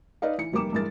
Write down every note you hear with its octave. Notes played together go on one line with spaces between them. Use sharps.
D#4 B4 D5 D#5 F5
E3 C#7
F1 G3 A#3 D6 E7
G2 E3 G#3 A#4 A6